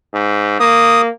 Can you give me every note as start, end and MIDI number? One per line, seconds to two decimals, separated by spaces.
0.13 0.56 44
0.60 1.09 58
0.60 1.01 87